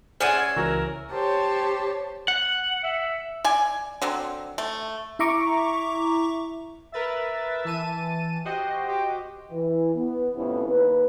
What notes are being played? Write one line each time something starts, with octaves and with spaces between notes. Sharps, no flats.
C#4 G#4 C5 D5 E5 F#5 G#5
C#2 E3 F#4 A#4 E6
G4 C5 C#5 A5
F#5
E5
D5 G#5
D3 F#3 C4
A3
E4 E5 A#5 C#6 D6
A#4 B4 E5 A6
E3 A5 D#7
F#4 G4 C5 D#5
G4
E3
B3
F2 A2 C3 B3 C#4 E4
D#2 B4